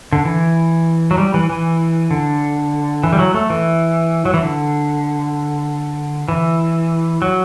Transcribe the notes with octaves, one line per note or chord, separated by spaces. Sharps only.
D3
E3
F#3
G3
E3
E3
D3
E3
G3
F#3
A3
E3
F#3
E3
D3
E3
F#3